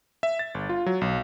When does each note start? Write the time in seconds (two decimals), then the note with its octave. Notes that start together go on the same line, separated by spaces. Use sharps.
0.23 E5
0.39 A6
0.54 G1
0.69 F4
0.86 F#3
1.01 B1